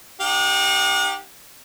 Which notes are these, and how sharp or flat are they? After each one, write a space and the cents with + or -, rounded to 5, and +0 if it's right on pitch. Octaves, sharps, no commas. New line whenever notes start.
D#4 -30 G4 +0 F#5 -40